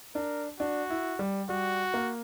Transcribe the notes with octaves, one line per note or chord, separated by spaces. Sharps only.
D4 A#4
D4 F#4
E4
G3
G3 F#4
A#3